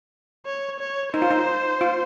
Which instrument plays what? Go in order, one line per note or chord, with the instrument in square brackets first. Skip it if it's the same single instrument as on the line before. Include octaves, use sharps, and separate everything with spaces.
[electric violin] C#5
C#5
[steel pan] D#4 [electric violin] C5
[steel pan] F4
D#4
F4